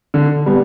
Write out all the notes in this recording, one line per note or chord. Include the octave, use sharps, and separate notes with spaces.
D3
G3 B3 D4